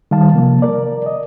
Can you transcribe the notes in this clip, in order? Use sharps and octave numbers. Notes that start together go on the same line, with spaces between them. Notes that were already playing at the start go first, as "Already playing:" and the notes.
D#3 G3 F5 A5
C3 F3 A#3
A#4 D5
D#5